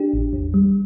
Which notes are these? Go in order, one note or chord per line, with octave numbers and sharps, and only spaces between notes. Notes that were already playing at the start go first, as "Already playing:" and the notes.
Already playing: D4 G4
A1
E2
G3